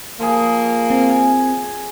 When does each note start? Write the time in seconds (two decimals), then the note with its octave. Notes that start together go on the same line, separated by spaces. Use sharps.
0.20 F3 A#3 G#4
0.90 C4
1.10 G#5